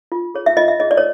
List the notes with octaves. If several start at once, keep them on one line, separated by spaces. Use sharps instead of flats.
F4
G#4 C#5
E5
F4 D#5
E5
G#4 C#5 D#5
D5
C#5